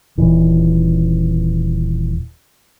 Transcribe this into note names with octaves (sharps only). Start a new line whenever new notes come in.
D#1 E3